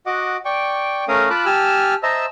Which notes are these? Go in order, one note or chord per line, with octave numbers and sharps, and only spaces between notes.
F#4 D#5 F#5 D6
D5 G5 C#6
A3 C#4 A#4 F5 D#6
F4 A5 B5 D6 F#6
G4 G#5 A5 E6 F6
C5 D#5 E5 A5 A#5 E6